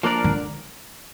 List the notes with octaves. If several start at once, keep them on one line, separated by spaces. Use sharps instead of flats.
F3 A#3 D4 A#4 D5
D3